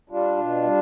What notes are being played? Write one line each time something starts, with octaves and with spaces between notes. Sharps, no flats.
G3 D4 F4
B2
G3